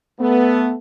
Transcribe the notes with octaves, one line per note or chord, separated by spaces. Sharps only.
A3 B3